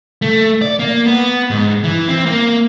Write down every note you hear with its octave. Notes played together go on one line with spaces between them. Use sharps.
A3
D5
A#3
B3
G#2
E3
C4
A#3